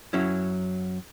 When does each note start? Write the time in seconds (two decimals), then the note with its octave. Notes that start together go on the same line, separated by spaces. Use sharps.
0.13 F#2 F#3 C#4 E4